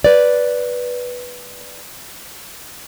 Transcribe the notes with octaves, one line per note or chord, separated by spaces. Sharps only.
B4 D5